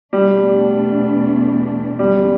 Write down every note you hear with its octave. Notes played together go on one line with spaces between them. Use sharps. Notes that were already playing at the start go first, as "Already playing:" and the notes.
E2 B2 G3 A3 D4
E2 D3 F#3 G3 C#4